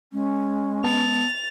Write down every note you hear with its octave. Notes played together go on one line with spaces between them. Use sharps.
G#3 C#4
B3 A5 A6 F7